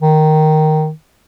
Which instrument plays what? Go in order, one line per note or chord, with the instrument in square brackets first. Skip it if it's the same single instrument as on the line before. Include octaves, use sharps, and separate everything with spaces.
[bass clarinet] D#3